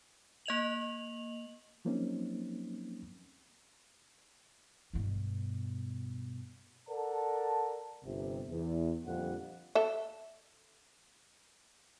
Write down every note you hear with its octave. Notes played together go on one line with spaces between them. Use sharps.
A#3 D#5 F7 F#7
F3 F#3 A#3 C4 C#4 D#4
G2 B2
A4 A#4 D5 F#5 A5
G1 C3
E2
F2 A#2 D3 F3 G3 F#5
A4 E5